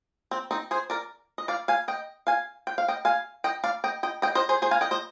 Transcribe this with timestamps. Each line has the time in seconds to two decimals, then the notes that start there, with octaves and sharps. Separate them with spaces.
0.31 C4
0.51 C4 D#4
0.71 G#4 C5
0.90 A#4 D5
1.38 D#5
1.48 D5 F5
1.68 F5 G#5
1.88 D#5 G5
2.27 F5 G#5
2.67 G5
2.78 F5
2.88 D#5 G5
3.05 F5 G#5
3.44 D#5 G5
3.64 D5 F5
3.84 D#5 G5
4.03 D#5 G5
4.22 D#5 G5
4.35 C5 D#5
4.49 G#4 C5
4.62 G#4 C5
4.71 F5 G#5
4.81 D#5 G5
4.91 C5 D#5